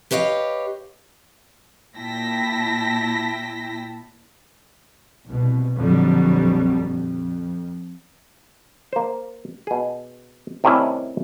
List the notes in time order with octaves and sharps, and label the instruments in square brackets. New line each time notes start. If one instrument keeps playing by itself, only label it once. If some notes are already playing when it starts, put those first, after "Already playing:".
[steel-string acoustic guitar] G4 B4 C#5 D#5 F5
[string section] A#2 E4 G5 A5 A#6 B6
[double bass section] C2 B2
A#1 F2 D3 F#3 G3
F2
[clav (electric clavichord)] A#3 C5
B2 G#4
A2 C3 D#3 G3 C#4 E4